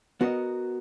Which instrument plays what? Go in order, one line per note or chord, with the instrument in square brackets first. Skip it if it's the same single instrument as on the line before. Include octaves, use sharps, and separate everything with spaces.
[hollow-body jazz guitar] B3 F#4 A#4 D#5